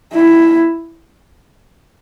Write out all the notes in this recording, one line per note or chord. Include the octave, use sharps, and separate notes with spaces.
E4